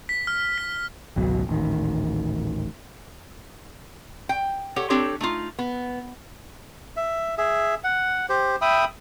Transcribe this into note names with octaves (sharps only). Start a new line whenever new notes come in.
B6
F6
B6
G#1 C#2 B2 F#3
D#1 A1 D#3
G5
G4 A4 C#5 F#5
C4 D4 G4 A4 C#5
A3 D#4 F4
B3
E5
G#4 E5
F#5
G4 C5
E5 G5 B5 D#6